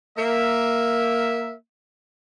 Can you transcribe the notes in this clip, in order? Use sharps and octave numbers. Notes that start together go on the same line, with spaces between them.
A#3 E5